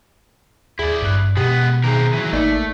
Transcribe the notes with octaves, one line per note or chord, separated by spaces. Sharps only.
D#2 E4 G#4 D5
G#1 G2 F#6
B2 G#3 B3 G4
D#3 C4 G#4 A#4
E3 F#3
G#1 A3 A#3 D#4 D5